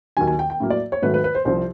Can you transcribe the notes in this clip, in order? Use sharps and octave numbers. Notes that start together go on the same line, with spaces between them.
D#2 D#3 F#3 G#5
G#5
G5
G5
A2 F#3 A#3
D5
C#5
G#2 D#3 F#3 A3 B4
B4
B4
C5
C2 C3 F3 C5